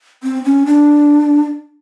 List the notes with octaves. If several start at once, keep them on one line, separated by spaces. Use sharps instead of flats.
C4
C#4
D4